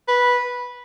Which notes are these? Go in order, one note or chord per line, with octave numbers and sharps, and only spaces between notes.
B4